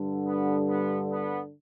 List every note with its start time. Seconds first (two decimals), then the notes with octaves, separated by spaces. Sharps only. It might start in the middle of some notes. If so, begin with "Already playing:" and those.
Already playing: G2 D3
0.26 B3
0.69 B3
1.11 B3